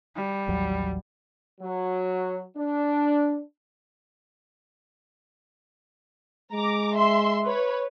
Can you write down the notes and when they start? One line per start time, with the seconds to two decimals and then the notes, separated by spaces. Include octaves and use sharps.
0.16 G3
0.48 A1 D#2 F#3
1.61 F#3
2.57 D4
6.52 G#3 A#5 D6
6.95 E5 C6
7.46 B4 C#5